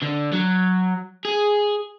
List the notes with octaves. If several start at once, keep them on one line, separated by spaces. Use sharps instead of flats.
D3
F#3
G#4